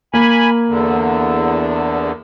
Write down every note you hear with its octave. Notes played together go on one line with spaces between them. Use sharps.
A#3 G#5 B5
E2 D3